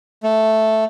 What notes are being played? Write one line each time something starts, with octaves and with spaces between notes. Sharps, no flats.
A3